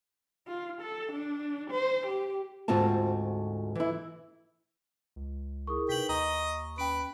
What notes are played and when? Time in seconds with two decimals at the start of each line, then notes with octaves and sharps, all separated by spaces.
0.47 F4
0.81 A4
1.12 D4
1.71 C5
2.07 G4
2.68 D2 G#2 C4 F4 F#4 A5
3.75 E3 E4
5.16 C#2
5.67 E4 G#4 A#4 C#6 D#6
5.89 C3 D#4 B4 G5 B6 F#7
6.09 D#2 D#5 A#5 C#6
6.78 C#4 B4 G5 D7